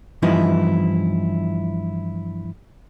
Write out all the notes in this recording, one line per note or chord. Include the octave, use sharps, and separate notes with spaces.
G2 E3 F3 B3 D#4 E4